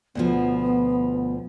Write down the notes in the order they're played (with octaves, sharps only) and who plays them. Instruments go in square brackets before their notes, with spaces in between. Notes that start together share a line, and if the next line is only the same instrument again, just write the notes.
[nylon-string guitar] D2 B2 F3 [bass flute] B3